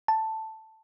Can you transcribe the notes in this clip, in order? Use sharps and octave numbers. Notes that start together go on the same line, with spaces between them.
A5